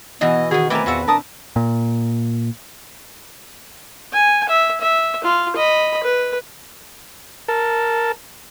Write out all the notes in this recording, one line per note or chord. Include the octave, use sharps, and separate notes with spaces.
B2 E3 B3 E4 D#5
D#3 B3 F#4 G#4
A3 C4 E4 A#4 B4 D5 G#5 D6
E2 A#2 F4 F#4 E5 F#5
D4 A#4 A5 D#6
A#2
G#5
E5
E5
F4
D#5 B5
B4
A#4 A5